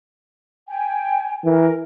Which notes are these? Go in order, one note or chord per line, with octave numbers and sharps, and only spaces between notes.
G5 G#5
E3 A#4